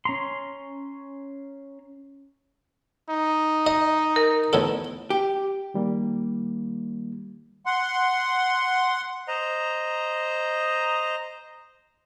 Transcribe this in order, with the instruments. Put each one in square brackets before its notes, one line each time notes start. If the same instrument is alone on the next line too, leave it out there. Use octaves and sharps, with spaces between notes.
[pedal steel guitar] C#4 A#5 C6
[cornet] D#4
[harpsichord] D#5
[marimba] A#4
[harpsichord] E2 A2 A4
[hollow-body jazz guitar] G4
[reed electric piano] D#3 G3 A#3
[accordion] F#5 C6
[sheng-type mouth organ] C5 D#5 A#5